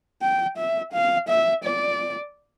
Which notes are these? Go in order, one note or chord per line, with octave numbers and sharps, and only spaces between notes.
G5
E5
F5
E5
D5